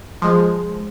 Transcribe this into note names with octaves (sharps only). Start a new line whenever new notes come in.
F3 G#3